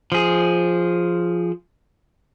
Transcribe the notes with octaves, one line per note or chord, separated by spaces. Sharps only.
F3 G#4